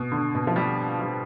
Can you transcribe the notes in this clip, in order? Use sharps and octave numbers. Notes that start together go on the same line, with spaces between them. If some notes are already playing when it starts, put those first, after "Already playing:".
Already playing: B2
D3
B2
F3
G3
G3